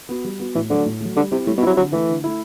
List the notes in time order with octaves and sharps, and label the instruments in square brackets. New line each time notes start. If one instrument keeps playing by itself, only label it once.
[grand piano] B3 F#4
G3
B3 F#4
[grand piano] A2 [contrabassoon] E3
[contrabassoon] D3 [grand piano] F#3 A3
[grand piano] A2
F#3 A3
[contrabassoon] D3 [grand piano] G3
[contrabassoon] C3 [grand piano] C4 E4 G4
[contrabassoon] A2 [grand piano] G3
[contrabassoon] B2
[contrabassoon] F#3 [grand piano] C4 E4 G4
[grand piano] D3 [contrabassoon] F#3
[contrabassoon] E3 [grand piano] A3 E4
[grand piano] D3
A3 E4